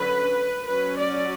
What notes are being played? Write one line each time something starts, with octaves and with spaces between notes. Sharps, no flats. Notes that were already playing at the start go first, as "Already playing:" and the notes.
Already playing: D3 F#3 C#4 B4
F#3 C#4 B4
D5